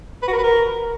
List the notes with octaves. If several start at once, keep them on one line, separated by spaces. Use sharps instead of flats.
B4
F#4
A#4
B4
A#4